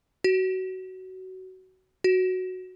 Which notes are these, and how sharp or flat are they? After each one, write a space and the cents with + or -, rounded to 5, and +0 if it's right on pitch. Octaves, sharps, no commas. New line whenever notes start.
F#4 +20
F#4 +0